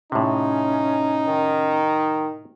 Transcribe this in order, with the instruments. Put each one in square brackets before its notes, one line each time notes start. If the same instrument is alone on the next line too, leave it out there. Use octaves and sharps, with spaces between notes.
[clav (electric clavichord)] A2 C3 [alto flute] C#4 [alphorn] D#4
[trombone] D#3